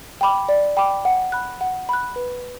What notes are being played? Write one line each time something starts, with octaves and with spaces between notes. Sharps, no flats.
G5 B5 D6
D5
G5 B5 D6
F#5
B5 F#6
F#5
B5 F#6
B4